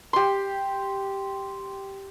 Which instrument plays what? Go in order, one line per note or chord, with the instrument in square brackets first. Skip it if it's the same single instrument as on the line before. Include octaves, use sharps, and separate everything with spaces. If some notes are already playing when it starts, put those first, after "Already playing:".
[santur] G4 C6